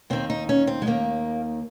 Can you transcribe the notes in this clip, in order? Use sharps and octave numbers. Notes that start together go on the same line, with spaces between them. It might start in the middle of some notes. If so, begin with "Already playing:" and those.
D#2 D#3 C4
D#4
C#4
C4
G#3
D#2 D#3 A#3